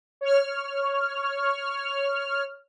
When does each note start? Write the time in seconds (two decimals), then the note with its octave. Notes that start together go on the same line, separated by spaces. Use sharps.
0.21 C#5 F6